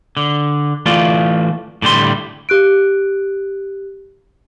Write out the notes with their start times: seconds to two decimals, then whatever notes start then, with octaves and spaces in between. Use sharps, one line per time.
0.17 D3
0.86 E3 A3 F4 D5
1.82 A2 D3 G3 C6
2.49 G4 F#6 D7